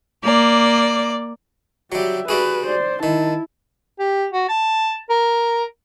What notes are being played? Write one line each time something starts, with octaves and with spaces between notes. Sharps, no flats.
A#3 D5
F#3 G3 G4 E5
G3 F#4 G#4 B4
C5 D5
D#3 E4 A5
G4
F#4
A5
A#4